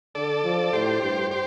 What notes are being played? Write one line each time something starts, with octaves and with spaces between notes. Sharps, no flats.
D3 A4 D5
F3
A2 G4 C5
G2
G4 C5